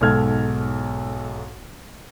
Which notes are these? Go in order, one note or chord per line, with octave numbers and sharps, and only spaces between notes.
B1 G#2 A4 F6 G#6